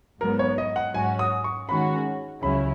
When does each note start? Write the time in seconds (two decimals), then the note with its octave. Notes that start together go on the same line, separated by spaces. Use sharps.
0.21 G#2 F#3 B3 A#4
0.39 C#5
0.58 D#5
0.76 F#5
0.94 G#2 F#3 C#4 F#4 G#5
1.19 D#6
1.44 C#6
1.69 D#3 G#3 C#4 F#4 B5
2.43 C#2 C#3 F#3 C#4 E4 B5